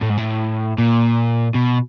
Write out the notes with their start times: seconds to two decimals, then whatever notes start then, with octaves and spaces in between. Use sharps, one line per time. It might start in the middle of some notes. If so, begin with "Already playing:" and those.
0.01 A2
0.09 G#2
0.18 A2
0.78 A#2
1.54 B2